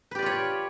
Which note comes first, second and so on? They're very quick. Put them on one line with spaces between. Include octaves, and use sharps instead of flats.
B4 G4 D5 F4 C#5